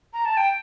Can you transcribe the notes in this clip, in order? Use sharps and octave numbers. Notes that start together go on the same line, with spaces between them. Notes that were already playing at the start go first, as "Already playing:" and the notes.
A#5
A5
G5